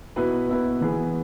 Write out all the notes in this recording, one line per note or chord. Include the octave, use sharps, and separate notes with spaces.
B2 B3 E4 B4
B2 B3 E4 B4
E3 B3 G#4